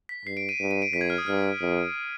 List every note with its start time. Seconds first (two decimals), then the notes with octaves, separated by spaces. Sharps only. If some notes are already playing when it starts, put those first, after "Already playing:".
0.09 B6
0.26 G2 C7
0.37 D7
0.49 D#7
0.60 G2
0.71 D#7
0.82 D7
0.93 F2 B6
1.01 G#6
1.10 F6
1.18 D#6
1.26 G2 F6
1.61 F2